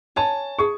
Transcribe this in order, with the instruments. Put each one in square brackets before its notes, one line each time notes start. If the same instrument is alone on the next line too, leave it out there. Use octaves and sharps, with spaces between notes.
[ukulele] C#5 G#5 [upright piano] A5
[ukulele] G#4 [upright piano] C#6